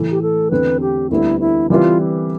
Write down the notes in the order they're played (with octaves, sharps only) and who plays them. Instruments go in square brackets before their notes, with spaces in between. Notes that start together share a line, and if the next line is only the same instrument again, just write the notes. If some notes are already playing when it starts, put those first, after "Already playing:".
Already playing: [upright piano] A2 E3 A3
[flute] G4
A4
[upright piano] E2 D3 A3 C4 [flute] B4
[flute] G4
[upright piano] D2 D3 G3 B3 [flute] E4
[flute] E4
[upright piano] E3 G3 C4 E4 B4 [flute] F4